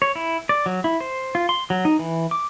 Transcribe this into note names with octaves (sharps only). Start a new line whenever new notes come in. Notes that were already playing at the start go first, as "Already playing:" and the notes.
C#5
E4
D5
F#3
E4
C5
F4
C6
F#3
D#4
E3
D6